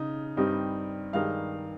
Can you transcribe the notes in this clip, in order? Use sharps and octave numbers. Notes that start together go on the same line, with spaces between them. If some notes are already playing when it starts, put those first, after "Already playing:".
Already playing: C#3 D#4
G2 G3 C4 D#4
G2 D#3 G#3 D#4 F5 F6